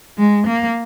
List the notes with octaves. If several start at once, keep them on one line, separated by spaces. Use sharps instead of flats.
G#3
A#3